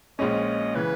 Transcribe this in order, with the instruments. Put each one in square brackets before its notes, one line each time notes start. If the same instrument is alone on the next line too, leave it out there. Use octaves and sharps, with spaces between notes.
[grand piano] A#1 A#2 G#3 C#4 [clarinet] D#5
[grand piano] C#3 E3 [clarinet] B4